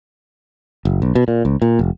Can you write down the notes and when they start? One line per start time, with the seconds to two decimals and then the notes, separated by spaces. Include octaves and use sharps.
0.85 F#1
1.02 B1
1.15 B2
1.28 A#2
1.45 C#2
1.62 A#2
1.79 F1